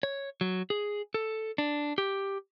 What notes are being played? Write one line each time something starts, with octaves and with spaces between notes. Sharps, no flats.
C#5
F#3
G#4
A4
D4
G4